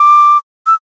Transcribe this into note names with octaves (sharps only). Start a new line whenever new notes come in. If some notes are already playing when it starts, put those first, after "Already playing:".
Already playing: D6
E6